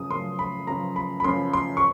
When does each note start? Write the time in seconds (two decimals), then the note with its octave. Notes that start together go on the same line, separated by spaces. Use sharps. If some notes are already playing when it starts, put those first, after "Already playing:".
Already playing: F#2 C#3 F3 D#6
0.11 F#2 C#3 F3 C6
0.39 B5
0.67 F#2 C#3 F3 A#5
0.96 B5
1.20 B5
1.24 F#2 C#3 F3 C6
1.53 C6
1.77 C#6